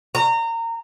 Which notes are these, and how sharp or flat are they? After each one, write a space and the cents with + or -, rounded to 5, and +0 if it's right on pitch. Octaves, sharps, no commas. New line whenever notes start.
A#5 -25